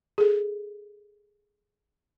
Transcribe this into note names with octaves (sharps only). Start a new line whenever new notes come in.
G#4 A4